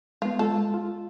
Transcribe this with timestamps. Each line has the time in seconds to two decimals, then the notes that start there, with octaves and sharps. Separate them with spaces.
0.22 G#3 B3 F4
0.39 G#3 F4 A4
0.74 F4